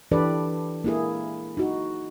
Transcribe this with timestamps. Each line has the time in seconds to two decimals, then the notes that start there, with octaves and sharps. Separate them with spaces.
0.11 E3 D4 G4 A4 B4 D5
0.84 A#3 E4 G#4
1.57 D#4 F#4